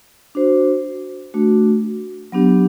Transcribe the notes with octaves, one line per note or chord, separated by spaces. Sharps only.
D4 F#4 C5
A3 D4 F#4
F#3 B3 D4 G4